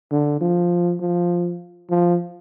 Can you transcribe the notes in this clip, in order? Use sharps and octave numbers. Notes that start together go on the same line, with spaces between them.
D3
F3
F3
F3